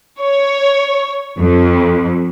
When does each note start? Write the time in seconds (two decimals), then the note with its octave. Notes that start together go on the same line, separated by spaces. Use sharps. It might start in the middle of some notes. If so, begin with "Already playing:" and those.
0.20 C#5
1.40 F2